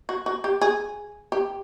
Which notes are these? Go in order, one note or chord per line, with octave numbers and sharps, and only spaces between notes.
F#4
F#4
G4
G#4
G4